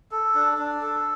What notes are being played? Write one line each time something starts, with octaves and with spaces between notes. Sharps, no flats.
A4
D4
D4
A4